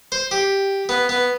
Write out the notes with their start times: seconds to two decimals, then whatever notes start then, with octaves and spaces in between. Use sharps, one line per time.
0.12 C5
0.31 G4
0.89 B3
1.09 B3